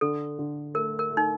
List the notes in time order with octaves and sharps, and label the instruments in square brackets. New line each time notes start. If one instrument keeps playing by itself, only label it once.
[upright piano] D3 [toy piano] A4
[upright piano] D3
[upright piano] A3 [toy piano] A#4
[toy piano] A#4
[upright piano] A3
[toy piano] D#4